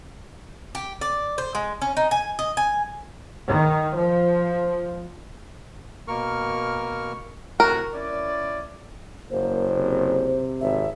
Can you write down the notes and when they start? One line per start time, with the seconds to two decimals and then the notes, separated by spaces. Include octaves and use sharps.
0.75 G4
1.01 D5
1.38 C5
1.55 G#3
1.82 C#4
1.97 D#4
2.11 G#5
2.39 D#5
2.57 G#5
3.47 D#3
3.94 F3
6.08 B2 A#3 A#4 C#6 F6
7.60 A2 C3 F#4 A#4
7.94 C#4 E4 D5
9.30 F#1 A#3 C5
9.76 C3
10.61 G#1 E5